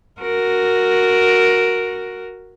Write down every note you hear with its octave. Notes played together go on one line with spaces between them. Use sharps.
F#4 A#4